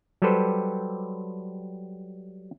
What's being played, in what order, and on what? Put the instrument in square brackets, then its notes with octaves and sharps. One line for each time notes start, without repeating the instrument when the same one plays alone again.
[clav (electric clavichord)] F#3 G3 G4 A4 B4 C5